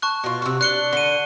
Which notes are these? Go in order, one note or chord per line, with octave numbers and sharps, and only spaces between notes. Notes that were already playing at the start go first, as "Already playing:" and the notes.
A5 C#6 F#6
B2 F4
C3 F#4
D4 F#6 C#7 G7
D3 D#7 G7